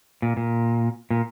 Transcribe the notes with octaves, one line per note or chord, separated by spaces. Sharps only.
A#2
A#2
A#2